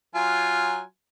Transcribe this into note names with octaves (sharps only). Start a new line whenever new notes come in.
F#3 F4 G#5